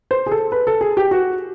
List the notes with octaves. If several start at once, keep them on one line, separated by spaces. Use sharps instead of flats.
C5
G#4
A4
B4
A4
G#4
G4
F#4